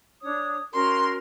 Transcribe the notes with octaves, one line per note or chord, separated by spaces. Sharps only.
D4 C#5 D#6
C#4 F#4 A#4 C6